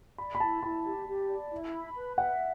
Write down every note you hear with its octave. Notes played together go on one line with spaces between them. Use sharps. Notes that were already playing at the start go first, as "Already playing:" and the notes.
D5 B5
B5
E4 A5
E4 B5
G4
G4
D5
E4
B5
B4
E5 F#5